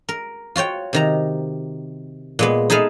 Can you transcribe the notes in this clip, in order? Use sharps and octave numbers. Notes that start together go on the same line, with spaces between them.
A#4
F4 F#4 C#5 G5
C3 D#3 A#5
A#2 G#3 B3
D#4 G#4 A4 B4 E5 F5